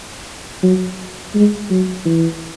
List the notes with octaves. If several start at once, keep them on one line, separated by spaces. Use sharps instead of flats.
F#3
G#3
F#3
E3